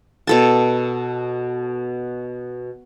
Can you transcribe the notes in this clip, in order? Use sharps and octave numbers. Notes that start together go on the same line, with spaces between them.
B2 A4 A5